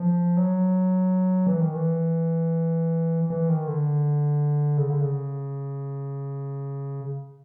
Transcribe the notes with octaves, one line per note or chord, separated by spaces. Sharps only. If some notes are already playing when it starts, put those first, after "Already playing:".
Already playing: F3
F#3
E3
D#3
E3
E3
D#3
D3
C#3
D3
C#3